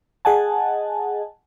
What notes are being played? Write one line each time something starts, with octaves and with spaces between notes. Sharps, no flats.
G#4 D#5 F#5 G#5 A5